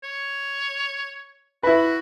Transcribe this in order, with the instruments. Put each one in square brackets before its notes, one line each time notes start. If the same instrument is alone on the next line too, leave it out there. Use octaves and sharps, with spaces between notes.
[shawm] C#5
[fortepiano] E4 B4 [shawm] F#4